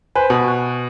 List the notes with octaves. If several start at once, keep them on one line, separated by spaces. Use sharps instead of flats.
B4 C5 G#5
B2 B4
C#6 F#6